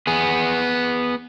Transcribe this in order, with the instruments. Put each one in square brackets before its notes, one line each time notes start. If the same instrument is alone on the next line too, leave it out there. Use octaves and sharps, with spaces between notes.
[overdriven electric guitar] B3 G#4